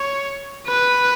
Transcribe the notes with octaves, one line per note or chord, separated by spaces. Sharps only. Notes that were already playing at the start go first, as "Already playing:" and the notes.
Already playing: C#5
B4